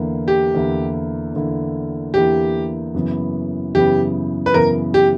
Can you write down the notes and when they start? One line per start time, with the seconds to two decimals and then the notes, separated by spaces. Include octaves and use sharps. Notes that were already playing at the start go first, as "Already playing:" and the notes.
Already playing: E2 D3 A#3 E4
0.28 G4
0.55 E2 D3 A#3 E4
1.34 E2 D3 A#3 E4
2.14 E2 D3 A#3 E4 G4
2.94 F#2 C#3 E3 B3
3.74 F#2 C#3 E3 B3 G4
4.46 B4
4.54 F#2 C#3 E3 B3 A#4
4.94 G4